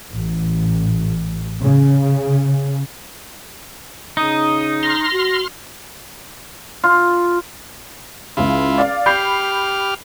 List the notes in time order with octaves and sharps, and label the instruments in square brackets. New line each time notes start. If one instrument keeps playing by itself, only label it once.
[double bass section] A1
C#3
[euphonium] C#3 [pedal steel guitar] D#4 [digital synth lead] D#6
[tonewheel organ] C6 F6 [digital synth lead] A#6
[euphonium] F#4
[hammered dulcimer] F4
[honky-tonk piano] C#2 C#3 [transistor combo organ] E4 F4
[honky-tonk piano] D5 F5
[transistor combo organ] G4 F6 [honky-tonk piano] B5 G6 C7